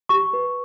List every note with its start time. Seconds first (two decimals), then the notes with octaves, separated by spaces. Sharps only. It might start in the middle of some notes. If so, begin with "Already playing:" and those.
0.09 G4 C#6
0.33 B4